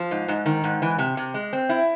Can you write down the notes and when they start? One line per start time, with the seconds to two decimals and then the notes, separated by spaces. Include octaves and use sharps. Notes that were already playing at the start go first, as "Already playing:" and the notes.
Already playing: F3
0.11 G#2
0.28 G#2
0.46 D#3
0.64 G#2
0.82 E3
0.98 C3
1.17 C3
1.34 G#3
1.53 C4
1.69 E4